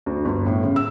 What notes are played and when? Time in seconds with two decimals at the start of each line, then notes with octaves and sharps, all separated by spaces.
0.06 D2
0.25 G1
0.47 A2
0.63 C#3
0.76 E6